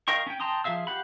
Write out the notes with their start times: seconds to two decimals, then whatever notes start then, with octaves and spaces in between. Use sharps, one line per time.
0.08 A#4 D#5 F5 G5 C#6
0.26 C#4 G5
0.40 G5 A5 A#5 C6 D#6
0.64 F3 G#4 E5 F5 E6
0.87 G4 F5 F#5 B5